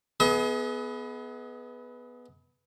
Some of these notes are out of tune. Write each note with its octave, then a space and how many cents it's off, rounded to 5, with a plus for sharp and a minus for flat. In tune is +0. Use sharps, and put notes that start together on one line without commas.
B3 +0 G#4 +30 D#5 +45